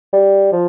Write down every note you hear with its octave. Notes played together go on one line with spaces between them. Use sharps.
G3
F3